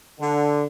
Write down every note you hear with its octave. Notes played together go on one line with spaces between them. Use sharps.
D3